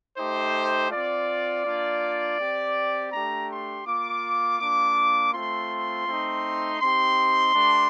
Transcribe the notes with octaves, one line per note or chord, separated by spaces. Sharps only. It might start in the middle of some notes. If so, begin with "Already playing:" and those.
A3 D#4 G4 C5
C4 F4 D5
A#3 D4 F4
C4 G4
A3 D4 G4 A#5
C6
A#3 F4 D6
A#3 D4 F4 D6
A3 C4 F4 C6
A3 C4 D#4
C4 D#4 G4 C6
A3 D4 G4